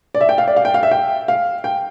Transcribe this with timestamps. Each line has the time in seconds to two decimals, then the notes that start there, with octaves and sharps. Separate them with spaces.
0.15 D5
0.21 E5
0.29 G5
0.38 F5
0.47 D5
0.56 F5
0.65 G5
0.74 F5
0.83 E5
0.91 G5
1.28 F5
1.64 G5